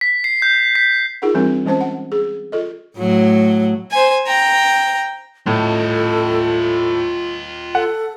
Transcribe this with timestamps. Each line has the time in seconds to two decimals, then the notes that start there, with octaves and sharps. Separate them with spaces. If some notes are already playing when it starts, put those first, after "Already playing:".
0.01 B6
0.24 C7
0.42 G6
0.75 B6
1.22 D#4 F4 G#4 A#4 F#5
1.34 E3 G3 C4 D4 F4 A#4
1.65 E3 G#3 C#4 C5 A5
1.81 F#5
2.12 G#4
2.52 F4 A4 D#5
2.97 A2 F#3
3.91 C5 G#5
4.27 G5 A#5
5.47 A2 F4 A4 D#5
7.75 A4 F#5